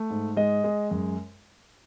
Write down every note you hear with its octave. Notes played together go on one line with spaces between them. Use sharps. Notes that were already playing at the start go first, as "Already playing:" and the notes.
Already playing: A3
G#2
G#3 D#5
G#3
F#2